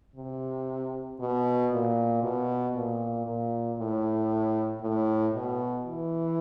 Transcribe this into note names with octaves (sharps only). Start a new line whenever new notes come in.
C3
B2
A#2
B2
A#2
A#2
A2
A2
B2
E3